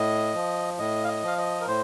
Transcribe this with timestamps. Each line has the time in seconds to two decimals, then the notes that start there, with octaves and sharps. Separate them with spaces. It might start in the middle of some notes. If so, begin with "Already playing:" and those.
Already playing: A2 D#5
0.35 F3
0.79 A2 D#5
1.04 F5
1.08 D#5
1.23 F3 F5
1.38 D#5
1.61 A#4
1.67 A2 C5